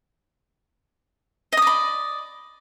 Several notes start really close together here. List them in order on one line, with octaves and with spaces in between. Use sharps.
D#5 D#6 D5 B5